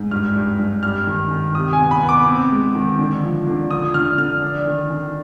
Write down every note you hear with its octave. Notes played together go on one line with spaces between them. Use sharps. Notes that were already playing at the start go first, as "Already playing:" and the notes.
Already playing: G#2
G2 F6
G2
G2
G3 F6
D#3
D#3
C3 D#6
G#5
B3
B5
B3
D6
C4
G#3
D#3
D3
F3
D3
F3 D#6
D3 F6
D3 F6
D4
D#3
D#3